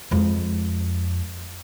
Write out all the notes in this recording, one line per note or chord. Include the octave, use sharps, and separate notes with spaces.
F2 G#3